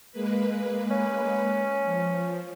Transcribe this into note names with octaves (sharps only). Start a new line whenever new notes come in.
G#3 A#3 B4
C#4
F3